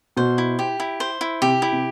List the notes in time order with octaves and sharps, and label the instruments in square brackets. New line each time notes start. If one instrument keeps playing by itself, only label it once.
[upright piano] B2 [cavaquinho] C5
[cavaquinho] E4
G4
E4
C5
E4
[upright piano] C3 [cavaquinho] G4
[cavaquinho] E4
[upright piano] C3